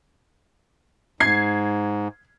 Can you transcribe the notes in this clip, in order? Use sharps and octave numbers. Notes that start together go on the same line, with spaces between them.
G#2 G#6 C7